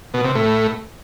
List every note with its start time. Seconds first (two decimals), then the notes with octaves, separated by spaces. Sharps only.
0.14 B2
0.25 C3
0.35 A2